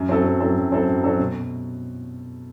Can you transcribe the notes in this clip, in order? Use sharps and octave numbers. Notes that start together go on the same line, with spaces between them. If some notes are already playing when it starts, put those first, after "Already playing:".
Already playing: F#2
F#3 C4 E4 A4
F#2
F#3 C4 E4 A4
F#2
F#3 C4 E4 A4
F#2
F#3 C4 E4 A4
B2